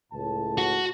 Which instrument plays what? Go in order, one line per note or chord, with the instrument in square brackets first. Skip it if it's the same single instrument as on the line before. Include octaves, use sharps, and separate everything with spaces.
[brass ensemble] C#2 A2 A5
[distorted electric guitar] F#4